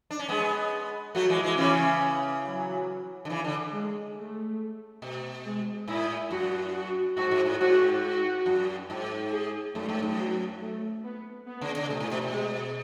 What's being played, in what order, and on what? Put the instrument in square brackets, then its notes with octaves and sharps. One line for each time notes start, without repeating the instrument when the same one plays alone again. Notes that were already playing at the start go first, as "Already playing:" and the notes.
[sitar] D4
C#4
[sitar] G#3 B3 [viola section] G#4
[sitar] F#3 A3 [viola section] F#4
[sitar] E3 G#3
E3 G#3
[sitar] C#3 E3 [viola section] C#4
[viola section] F#3
[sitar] D3
C#3 E3
D3
[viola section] G#3
A3
[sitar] B2
[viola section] G#3
[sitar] A2 [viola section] E4
[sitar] F#2 [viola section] F#4
[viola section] F#4
[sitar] G#2 [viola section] F#4
[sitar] G#2
A2
[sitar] G#2 [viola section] F#4
[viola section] F#4
[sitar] F#2
G#2
[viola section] G#4
[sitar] F#2 [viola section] A3
[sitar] G#2
F#2
[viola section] F#3
A3
B3
B3
[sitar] C#3
C#3
[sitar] B2 [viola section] A3
[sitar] A2
B2
B2
[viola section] G#3